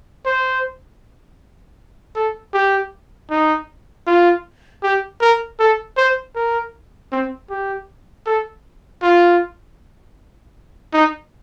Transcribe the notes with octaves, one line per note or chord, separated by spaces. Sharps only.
C5
A4
G4
D#4
F4
G4
A#4
A4
C5
A#4
C4
G4
A4
F4
D#4